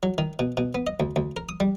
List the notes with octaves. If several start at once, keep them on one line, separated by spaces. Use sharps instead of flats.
F#3
D#3
B2
B2
B3
D#5
D2
D2
A#4
D#6
G3